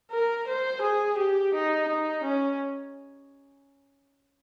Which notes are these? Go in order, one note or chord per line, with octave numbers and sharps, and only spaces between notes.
A#4
C5
G#4
G4
D#4
D#4
C#4